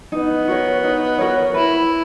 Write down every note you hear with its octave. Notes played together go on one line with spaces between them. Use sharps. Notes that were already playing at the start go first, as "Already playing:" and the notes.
B3 D#4
F#4 A#4 C#5
D#4
F#4 A#4 C#5
E4 B4